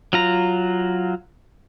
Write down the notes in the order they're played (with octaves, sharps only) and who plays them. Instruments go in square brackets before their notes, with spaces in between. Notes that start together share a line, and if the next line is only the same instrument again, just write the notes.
[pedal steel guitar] F#3 F4 A#5